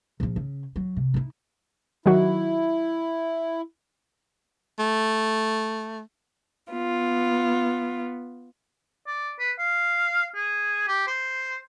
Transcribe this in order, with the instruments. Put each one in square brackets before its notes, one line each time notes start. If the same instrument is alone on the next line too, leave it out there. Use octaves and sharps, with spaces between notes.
[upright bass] A#1 F3
C#3
F#3
C3
D#4 E4
[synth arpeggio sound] D#3 F#3 F#4 [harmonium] E4
[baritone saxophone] A3
[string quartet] B3 F4
[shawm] D5
B4
F5
G#4
G4
C5